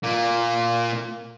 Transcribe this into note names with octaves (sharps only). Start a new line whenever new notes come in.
A#2 A#3